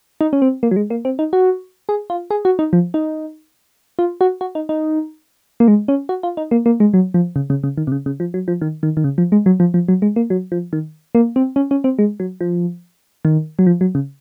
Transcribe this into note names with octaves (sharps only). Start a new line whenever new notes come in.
D#4
C#4
C4
A#3
F#3
G#3
A#3
C4
D#4
F#4
G#4
F4
G#4
F#4
D#4
F3
D#4
F4
F#4
F#4
D#4
D#4
A#3
G#3
C#4
F#4
F4
D#4
A#3
A#3
G#3
F#3
F3
C#3
C#3
C#3
D#3
C3
C#3
C#3
F3
F#3
F3
D#3
D#3
D#3
C#3
F3
G#3
F#3
F3
F3
F#3
G#3
A#3
F#3
F3
D#3
A#3
C4
C#4
C#4
C4
G#3
F#3
F3
D#3
F#3
F3
F#3
C#3